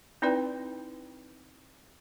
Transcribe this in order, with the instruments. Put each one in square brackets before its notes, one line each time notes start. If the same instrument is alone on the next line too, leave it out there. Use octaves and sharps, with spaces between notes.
[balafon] C4 D#4 E4 B4 D5 G5